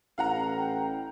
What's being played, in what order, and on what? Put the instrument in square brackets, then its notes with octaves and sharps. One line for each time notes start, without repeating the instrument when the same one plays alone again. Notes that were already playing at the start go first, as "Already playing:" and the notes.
[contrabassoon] A1 [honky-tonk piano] F5 F#5 A#5
[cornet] G5